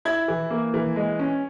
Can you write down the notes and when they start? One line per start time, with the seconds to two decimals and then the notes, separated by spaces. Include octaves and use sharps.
0.05 E4 G#6
0.28 E3
0.50 A#3
0.74 E3
0.96 G#3
1.19 C#4